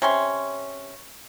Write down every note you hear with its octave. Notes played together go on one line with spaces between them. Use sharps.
C3 C#4 C6